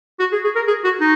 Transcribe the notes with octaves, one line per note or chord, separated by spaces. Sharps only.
F#4
G#4
G#4
A#4
G#4
F#4
D#4